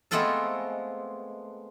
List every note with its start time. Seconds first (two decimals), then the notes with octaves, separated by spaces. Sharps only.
0.11 G#3 A3 B3 C4 F4 A4